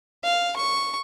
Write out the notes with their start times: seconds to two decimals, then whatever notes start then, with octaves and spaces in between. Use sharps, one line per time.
0.24 F5
0.56 C#6